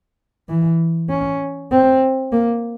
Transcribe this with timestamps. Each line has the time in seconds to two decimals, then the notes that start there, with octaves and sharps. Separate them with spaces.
0.49 E3
1.10 C#4
1.72 C4
2.32 A#3